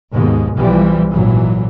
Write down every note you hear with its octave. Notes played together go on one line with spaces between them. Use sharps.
D#2 G#2 B2 G#3
B1 E3 F3 G3
G#1 A#2 E3 F#3